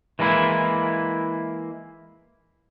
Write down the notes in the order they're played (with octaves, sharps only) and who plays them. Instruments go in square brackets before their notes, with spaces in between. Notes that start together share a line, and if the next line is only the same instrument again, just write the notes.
[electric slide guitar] E3 G#3 A#3 E4